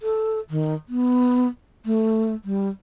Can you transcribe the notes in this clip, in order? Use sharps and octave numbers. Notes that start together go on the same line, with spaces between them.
A4
D#3
B3
A3
G3